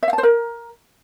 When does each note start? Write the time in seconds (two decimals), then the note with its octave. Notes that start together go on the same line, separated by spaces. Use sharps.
0.03 E5
0.08 F5
0.13 A5
0.18 C5
0.23 A#4